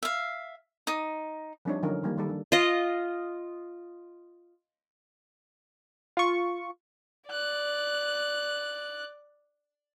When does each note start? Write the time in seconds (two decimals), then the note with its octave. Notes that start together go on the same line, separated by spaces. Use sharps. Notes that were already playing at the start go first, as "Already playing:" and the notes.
0.03 E5 F5
0.87 D#4 D#6
1.65 F3 G3 C4 D4 D#4 C#5
1.83 D3 F3 F#3 C#4 D#4 A#4
2.03 D#3 G3 A#3
2.17 D#3 G3 A4
2.29 D4
2.52 F4 D#5
6.17 F4 C#6
7.28 D5 F#6